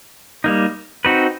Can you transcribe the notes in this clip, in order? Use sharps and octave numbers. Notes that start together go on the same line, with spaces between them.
G3 A#3 D#4
C4 D#4 F#4 B4